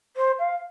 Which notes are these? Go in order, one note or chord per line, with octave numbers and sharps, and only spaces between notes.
C5
F5